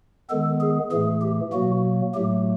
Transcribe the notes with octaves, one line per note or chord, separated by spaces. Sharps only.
D#3 G#3 B3 A4
G#4
A2 E3 A3 G#4
G4
B2 F#3 A#3 F#4
A2 F#3 A3 G4